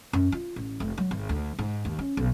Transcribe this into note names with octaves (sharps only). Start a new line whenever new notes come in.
F#2
F4
A1
F1
F#3
G#1
D2
G#2
D#2
C#4
B1